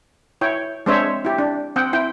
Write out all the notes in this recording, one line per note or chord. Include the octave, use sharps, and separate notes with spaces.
E4 C#5 G5
G#3 C4 D4 C5 C#5 E5
E4 G4
D4
C4 F#5 G5
E4 G5